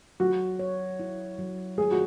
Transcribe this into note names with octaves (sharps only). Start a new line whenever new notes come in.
F#3 F#4
C#5
E4
F#3
G#3 G#4
F#4